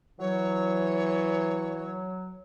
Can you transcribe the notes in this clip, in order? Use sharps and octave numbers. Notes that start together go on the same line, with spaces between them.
E3 F#3 C#5